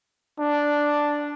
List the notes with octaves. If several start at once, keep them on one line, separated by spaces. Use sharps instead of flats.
D4